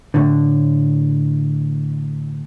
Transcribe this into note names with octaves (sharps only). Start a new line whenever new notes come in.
A2 D3